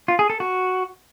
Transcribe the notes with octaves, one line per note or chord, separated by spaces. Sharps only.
F4
G#4
A4
F#4